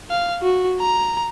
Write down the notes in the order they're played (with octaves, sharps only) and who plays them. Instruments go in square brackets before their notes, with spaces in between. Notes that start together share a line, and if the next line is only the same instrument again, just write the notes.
[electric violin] F5
F#4
A#5